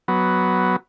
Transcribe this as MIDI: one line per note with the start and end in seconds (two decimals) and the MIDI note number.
0.08 0.76 54
0.08 0.76 59